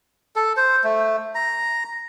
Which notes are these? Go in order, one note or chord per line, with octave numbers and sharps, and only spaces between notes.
A4
C5
A3
A#5